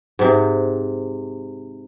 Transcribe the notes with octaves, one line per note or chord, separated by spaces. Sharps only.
G#2 C3